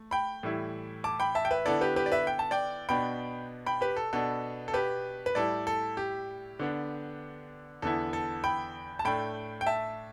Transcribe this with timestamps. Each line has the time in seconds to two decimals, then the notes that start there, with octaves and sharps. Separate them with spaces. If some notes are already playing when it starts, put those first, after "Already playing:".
Already playing: A3
0.11 G5 B5
0.43 A2 E3 G3 E4
1.04 A5 D6
1.20 G5 B5
1.35 E5 A5
1.45 G5
1.51 B4 E5
1.66 D3 B3 E4 A4 D5
1.81 G4 B4
1.96 G4 B4
2.06 D5
2.12 B4 E5
2.27 G5
2.39 A5
2.51 D5 G5
2.89 B2 B3 D4 G5 B5
3.66 G5 B5
3.81 G4 B4
3.97 A4
4.13 B2 B3 D4 A4
4.68 A4
4.74 G4 B4
5.26 B4
5.35 A2 G3 E4 A4 D5
5.67 A4
5.97 G4
6.59 D3 B3 D4
7.82 E2 D3 B3 E4 A4
8.13 A4
8.44 G5 B5
8.99 A5
9.05 A2 A3 D4 G5 B5
9.61 G5
9.66 E5 A5